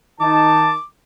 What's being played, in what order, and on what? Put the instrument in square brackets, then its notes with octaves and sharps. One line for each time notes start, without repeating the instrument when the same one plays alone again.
[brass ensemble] D#3 D#4 A5 [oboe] D6